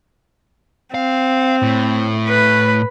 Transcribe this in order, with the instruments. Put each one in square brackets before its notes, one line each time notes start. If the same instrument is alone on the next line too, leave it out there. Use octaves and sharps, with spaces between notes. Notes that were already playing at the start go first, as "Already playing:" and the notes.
[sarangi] C4 [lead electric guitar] F5
[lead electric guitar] A2
[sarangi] B4